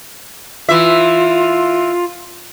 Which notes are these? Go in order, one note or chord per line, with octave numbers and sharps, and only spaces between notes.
E3 F4 E5